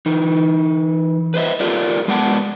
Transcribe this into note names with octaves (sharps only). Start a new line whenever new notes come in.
E3 D#4
B4 C5 D#5 E5
F4 G4 A4 A#4 D5
G#3 B3 D5 F#5 A5